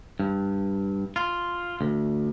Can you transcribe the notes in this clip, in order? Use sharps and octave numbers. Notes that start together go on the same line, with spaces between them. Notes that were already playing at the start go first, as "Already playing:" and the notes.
G2
F4
D2